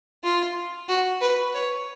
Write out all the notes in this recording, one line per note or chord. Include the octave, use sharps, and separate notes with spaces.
F4
F#4
B4
C#5